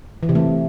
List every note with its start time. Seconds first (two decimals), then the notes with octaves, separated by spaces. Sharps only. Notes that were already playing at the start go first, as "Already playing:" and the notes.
0.23 E3
0.29 C3
0.35 A3